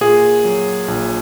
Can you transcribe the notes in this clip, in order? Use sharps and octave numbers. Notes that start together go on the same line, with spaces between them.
A#2 G#4
F#3
A#1